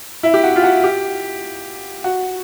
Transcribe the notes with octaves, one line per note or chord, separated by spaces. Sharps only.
E4
G4
F#4
F4
F#4
G4
F#4